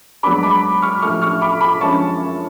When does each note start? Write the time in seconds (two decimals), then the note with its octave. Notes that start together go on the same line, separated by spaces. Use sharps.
0.23 G#2 F#3 B3 D4 B5 D6
0.43 B5 D6
0.82 C#6 F6
1.02 A1 A2 F3 A3 C#6 F6
1.21 C#6 F6
1.41 B5 D6
1.61 B5 D6
1.80 F#2 D3 F3 G#3 C#4 A5 C#6